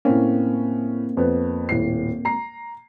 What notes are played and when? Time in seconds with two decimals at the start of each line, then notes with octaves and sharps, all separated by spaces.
0.05 A2 A#3 C4 C#4
1.17 F2 B3
1.69 D#1 A2 C7
2.25 A#5 C7